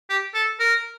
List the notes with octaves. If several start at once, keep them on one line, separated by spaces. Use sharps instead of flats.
G4
A4
A#4